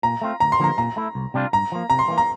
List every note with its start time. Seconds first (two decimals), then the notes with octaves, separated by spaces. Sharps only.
0.03 A#2 A#5
0.21 A3 C4 F4
0.40 D2 A#5
0.52 C6
0.60 D3 F3 A#3 A#5
0.78 A#2 A#5
0.97 A3 E4
1.15 C2
1.34 C3 G3 D4 F4
1.53 G2 A#5
1.72 F3 A#3
1.90 C3 A#5
1.99 C6
2.08 E3 G3 A#3
2.18 A#5